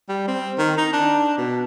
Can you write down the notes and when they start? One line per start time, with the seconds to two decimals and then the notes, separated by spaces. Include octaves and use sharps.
0.09 G3
0.28 C4
0.58 D#3
0.77 D#4
0.93 D4
1.38 B2